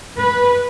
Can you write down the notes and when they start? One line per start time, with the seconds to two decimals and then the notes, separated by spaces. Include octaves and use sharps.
0.17 B4